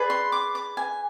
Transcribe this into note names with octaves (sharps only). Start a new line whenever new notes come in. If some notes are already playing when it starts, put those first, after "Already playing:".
Already playing: G#4 B4 D5
C6
D6
D6
G#5